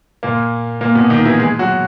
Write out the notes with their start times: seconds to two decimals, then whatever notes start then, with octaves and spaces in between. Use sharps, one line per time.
0.23 A#2 A#3
0.81 A#2 A#3
0.95 B2 B3
1.10 D#3 D#4
1.25 E3 E4
1.39 G#3 G#4
1.59 F#3 F#4